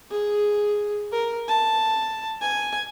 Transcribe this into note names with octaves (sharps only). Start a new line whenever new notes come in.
G#4
A#4
A5
G#5